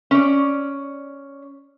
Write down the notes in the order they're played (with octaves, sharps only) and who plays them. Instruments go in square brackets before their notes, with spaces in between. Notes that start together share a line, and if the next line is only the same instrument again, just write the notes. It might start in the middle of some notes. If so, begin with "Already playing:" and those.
[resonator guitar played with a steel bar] C#4 D5